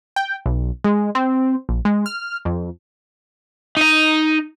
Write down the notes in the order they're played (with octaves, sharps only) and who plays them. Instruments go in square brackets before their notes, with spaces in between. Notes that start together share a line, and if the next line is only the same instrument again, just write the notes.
[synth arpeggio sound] G5
B1
G#3
C4
A#1
G#3
F6
F2
[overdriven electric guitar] D#4 D#5